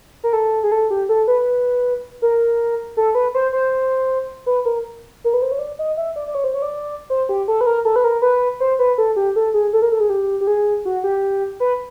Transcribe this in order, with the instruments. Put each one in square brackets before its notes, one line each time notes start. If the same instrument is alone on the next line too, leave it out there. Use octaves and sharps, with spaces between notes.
[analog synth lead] A#4
A4
G#4
A4
G4
A4
B4
A#4
A4
B4
C5
C5
B4
A#4
A#4
B4
C5
C#5
D5
D#5
E5
D5
D5
C#5
C5
C#5
D5
C5
G4
A4
B4
A#4
A4
B4
A#4
B4
C5
B4
A4
G4
A4
G#4
A4
A#4
A4
G#4
G4
G4
G#4
F#4
G4
B4